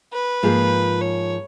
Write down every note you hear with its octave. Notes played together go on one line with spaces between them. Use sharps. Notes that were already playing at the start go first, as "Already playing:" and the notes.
B4
G#2 F3 A#3 F4 G#4
C#5